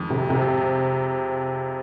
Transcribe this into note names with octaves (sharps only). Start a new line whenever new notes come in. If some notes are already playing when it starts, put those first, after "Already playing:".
Already playing: F2 D#3 G#3
C3
C3